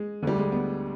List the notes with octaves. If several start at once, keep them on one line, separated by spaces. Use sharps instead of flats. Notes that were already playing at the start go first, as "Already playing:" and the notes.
Already playing: G#3
D2 D3 G3
G#3
B3